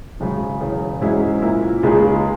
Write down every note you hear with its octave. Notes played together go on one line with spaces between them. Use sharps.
G#1 F#2 C#3
E1 E2 C#3
G#2 F#3 C#4 E4 G#4
A#2 A#3 E4
C#2 C#3 G#3 D#4 G#4